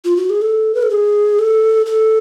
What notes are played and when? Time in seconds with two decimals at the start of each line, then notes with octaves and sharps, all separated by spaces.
0.05 F4
0.17 F#4
0.30 G#4
0.42 A4
0.75 B4
0.83 A4
0.90 G#4
1.39 A4
1.86 A4